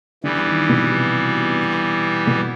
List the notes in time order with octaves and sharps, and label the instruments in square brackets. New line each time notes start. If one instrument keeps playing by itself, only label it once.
[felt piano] D3 [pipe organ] E3 G3 B3
[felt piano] D#3
B2
C3
B2